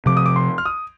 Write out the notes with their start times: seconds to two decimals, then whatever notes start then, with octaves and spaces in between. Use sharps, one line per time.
0.06 C3 F3 C4 D6
0.17 D#6
0.26 D6
0.36 C6
0.58 F6
0.66 D#6